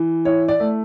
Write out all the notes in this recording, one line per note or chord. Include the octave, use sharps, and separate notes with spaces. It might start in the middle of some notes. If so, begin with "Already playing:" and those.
Already playing: E3
E4 C#5
D5
A3